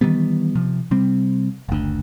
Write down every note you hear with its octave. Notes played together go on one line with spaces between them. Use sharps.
D#3 E3 G3 B3
C3 F3
C3 G3 C4
F#1 D2